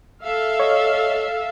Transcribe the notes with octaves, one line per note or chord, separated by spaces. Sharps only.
A4 E5 F5
C#5 D#5